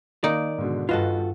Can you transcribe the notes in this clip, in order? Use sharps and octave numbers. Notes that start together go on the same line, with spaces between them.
D#3 A#3 D#4 D5
G#2 B2 D3
G2 F4 F#4 A4 B4 D#5